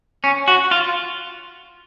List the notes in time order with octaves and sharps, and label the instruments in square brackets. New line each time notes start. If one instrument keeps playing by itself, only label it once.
[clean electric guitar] C#4
F#4
F4